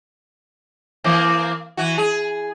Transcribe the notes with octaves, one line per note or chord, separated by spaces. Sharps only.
E3 A#3 C4
E3 F#4
G#4